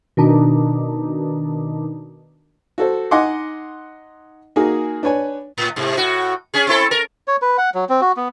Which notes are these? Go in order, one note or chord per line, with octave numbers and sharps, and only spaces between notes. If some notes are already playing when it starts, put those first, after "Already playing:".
B2 D#3 D4 D#4
F#4 A4 C5
D#4 D#5 F#5 G#5 C6 D6
A#3 D#4 F#4 G#4
D4 B4 C#5 G#5
A2
G#2 C3
A2 F#4
C#4 G#4
C4 E4 A4
A#4
C#5
B4
F#5
F#3
C4
F#4
B3